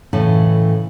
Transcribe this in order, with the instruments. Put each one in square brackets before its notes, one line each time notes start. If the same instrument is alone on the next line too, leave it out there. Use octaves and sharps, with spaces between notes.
[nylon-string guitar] A2 C#3 E3 A4